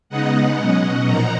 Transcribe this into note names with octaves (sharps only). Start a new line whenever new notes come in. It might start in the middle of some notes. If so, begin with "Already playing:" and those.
C#3 G#3 B3 D#4 D#5 F#5
B2 F#3 C#4
A#2 F3 A#3 D#4 F#5 A#5